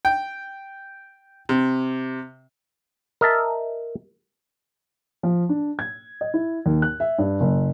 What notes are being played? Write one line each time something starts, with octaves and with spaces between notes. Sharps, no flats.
G5
C3
A#4 D#5 E5 A5
F3
D4
G#6
D#5
E4
D#2
F#6
E5
G2
F#1